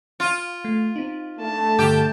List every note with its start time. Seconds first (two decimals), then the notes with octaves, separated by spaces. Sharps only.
0.20 F4
0.65 A3
0.96 C4 D#4
1.39 A3 D4 A5
1.79 G2 D3 G4